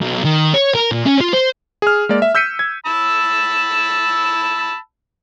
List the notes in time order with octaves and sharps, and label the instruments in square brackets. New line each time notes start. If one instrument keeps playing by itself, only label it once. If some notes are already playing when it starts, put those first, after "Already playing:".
[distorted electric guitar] B1
D#3
C#5
A#4
A#2
C#4
F4
C5
[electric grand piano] G#4 F6
G#3 A#3 D5
E5
E6 G6 B6 C#7 D#7
G#6
[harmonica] A5 B5 E6